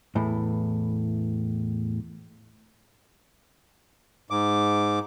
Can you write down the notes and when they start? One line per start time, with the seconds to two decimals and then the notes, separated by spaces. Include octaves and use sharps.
0.15 E2 A2 E3
4.30 G#2 D6